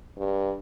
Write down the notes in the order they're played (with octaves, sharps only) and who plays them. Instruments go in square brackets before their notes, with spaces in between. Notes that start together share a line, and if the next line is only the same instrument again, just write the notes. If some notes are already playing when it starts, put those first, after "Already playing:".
[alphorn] G2